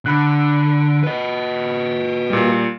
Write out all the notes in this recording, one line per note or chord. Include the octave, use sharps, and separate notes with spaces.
D3 B5 F#6
B4 D#5
A#2 G3